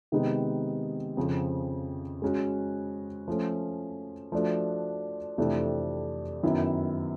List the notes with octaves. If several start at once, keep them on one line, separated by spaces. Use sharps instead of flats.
C3 D#3 G#3 B3 D#4
F2 C#3 F3
G#3 C#4 F#4
F3 A3 C#4
F3 A3 D4 F#4
F2 C3 E3 A3 D4
F#2 D#3 F#3 B3 E4